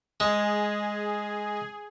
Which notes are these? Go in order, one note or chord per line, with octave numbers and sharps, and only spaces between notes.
G#3 G#4